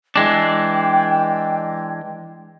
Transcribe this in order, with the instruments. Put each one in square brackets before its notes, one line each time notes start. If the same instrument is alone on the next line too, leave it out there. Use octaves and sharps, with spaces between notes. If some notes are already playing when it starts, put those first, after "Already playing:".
[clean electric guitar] E3 G#3 D4 [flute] G5